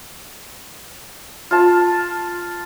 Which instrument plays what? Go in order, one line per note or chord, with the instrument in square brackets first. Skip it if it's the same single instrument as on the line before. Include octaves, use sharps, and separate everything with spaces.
[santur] F4 A5